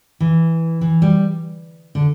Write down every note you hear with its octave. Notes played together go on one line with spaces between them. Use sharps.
E3
E3
G3
D3